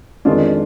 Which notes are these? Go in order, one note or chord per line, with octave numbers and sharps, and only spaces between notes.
F2 D#3 G#3 D4 F4